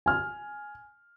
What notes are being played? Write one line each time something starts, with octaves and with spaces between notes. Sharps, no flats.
G#5 F6